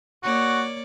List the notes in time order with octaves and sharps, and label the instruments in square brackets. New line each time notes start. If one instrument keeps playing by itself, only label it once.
[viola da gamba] A#3 C#5 D5 [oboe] F#4